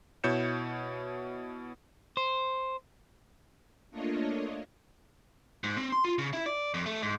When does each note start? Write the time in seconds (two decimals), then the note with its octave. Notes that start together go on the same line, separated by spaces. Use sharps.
0.24 B2 E4 C#5 G6 C#7 E7
2.17 C5
3.91 A3 A#3 D4 F4 C#5 D#5
5.64 G#2
5.78 C4
5.92 C6
6.05 F4
6.19 C#3
6.33 E4
6.46 D5
6.74 F2
6.86 A3
7.02 G#2